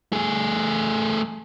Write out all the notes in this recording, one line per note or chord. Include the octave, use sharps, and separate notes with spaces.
A3 G#4